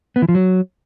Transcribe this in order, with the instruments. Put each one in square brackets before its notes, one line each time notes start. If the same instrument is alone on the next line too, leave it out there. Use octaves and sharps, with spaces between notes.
[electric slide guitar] B3
E3
F3
F#3